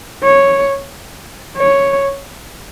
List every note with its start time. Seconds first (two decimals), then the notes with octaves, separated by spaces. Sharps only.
0.23 C#5
1.57 C#5